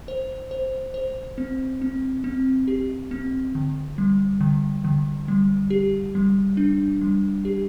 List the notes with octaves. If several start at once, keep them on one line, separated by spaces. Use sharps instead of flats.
C5
C5
C5
C4
C4
C4
G4
C4
D3
G3
D3
D3
G3
G4
G3
D4
G3
G4